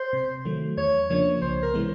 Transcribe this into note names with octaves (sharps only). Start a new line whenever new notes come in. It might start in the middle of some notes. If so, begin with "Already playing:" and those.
Already playing: C5
C3
D#3 F#3 A3
E2 C#5
C#3 F3 A#3 D4 C#5
C2 C5
A#4
C3 E3 G#3 B3